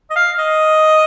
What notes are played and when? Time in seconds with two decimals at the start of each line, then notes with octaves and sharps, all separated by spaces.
0.10 D#5
0.16 F5
0.39 D#5